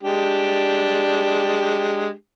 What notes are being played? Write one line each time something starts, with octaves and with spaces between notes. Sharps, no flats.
G#3 D4 G4